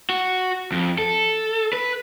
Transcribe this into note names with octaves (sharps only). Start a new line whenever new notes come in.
F#4
F2
A4
B4